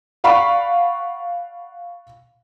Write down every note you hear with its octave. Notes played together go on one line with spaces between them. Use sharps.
D5 F5 F#5 B5 C#6